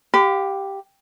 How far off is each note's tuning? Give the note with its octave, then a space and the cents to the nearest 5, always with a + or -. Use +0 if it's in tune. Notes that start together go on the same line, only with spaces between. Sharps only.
G4 +0 F5 +30 B5 +45